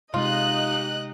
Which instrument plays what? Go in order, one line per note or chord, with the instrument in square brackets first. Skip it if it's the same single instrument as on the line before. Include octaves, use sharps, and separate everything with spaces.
[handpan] C3 G#3 F5 [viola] D#4 G4 [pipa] F4 [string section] D#5 F#6